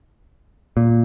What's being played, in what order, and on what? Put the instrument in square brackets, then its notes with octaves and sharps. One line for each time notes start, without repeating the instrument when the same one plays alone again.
[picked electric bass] A#2